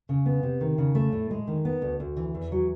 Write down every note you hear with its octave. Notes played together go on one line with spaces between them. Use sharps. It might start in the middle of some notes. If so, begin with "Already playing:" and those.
C#3
B3
C3
D#3
C#3
A3
A2
G#3
D#3
B3
D2
D2
E3
E2
F#3